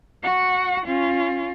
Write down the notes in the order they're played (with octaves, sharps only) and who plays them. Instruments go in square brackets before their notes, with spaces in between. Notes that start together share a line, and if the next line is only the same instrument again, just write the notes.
[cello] F#4 F#5
C#4 F4